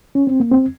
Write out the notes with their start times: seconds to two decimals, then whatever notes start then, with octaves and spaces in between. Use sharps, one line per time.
0.15 C#4
0.27 C4
0.40 A#3
0.52 C4